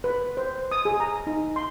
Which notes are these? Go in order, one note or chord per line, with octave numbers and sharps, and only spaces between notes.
B4
C5
D#6
G#4
A#5
D#4
C6